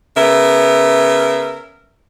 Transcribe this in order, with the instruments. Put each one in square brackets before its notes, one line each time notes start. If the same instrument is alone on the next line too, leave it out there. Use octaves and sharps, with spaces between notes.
[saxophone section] C#3 B3 A#4 E5